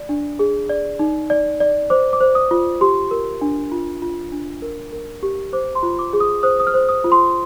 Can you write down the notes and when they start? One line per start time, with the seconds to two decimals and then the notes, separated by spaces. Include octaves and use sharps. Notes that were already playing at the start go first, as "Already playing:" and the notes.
Already playing: D5
0.09 D4
0.39 G#4
0.69 D5
0.99 D#4
1.30 D5
1.60 D5
1.90 C5 D6
2.13 D6
2.20 C5
2.35 D#6
2.51 F4
2.81 G4 C6
3.11 A#4
3.41 D4
3.72 F4
4.02 F4
4.32 D4
4.62 A#4
4.92 A#4
5.23 G4
5.53 C5 D6
5.75 C6
5.83 F4
5.99 D6
6.13 G#4
6.20 D#6
6.43 C5 D#6
6.60 D#6
6.67 F6
6.74 C5
6.89 D#6
7.04 F4
7.12 C6